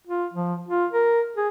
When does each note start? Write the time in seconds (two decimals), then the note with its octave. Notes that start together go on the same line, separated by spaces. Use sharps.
0.07 F4
0.33 F3
0.69 F4
0.93 A#4
1.37 G#4